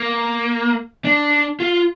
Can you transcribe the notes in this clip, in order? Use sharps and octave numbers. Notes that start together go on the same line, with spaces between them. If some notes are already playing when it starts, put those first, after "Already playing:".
Already playing: A#3
D4
F4